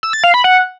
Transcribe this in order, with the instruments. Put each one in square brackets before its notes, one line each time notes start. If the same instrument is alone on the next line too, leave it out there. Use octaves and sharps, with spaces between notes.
[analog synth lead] E6
A6
F5
B5
F#5